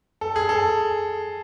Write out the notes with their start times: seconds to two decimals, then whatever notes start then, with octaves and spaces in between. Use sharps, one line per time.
0.21 A4
0.36 G#4
0.49 A4